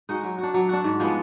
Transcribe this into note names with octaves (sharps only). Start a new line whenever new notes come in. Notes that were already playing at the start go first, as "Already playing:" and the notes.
G#3 D#4 F#4
F#3
D4 F#4
F#3
D4 F#4
G#2
F3 G#3 B3